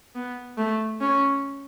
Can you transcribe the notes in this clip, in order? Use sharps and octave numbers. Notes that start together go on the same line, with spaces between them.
B3
A3
C#4